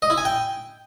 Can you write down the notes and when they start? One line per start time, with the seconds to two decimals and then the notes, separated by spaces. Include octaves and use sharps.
0.02 D#5
0.10 E4
0.18 G#5
0.25 G5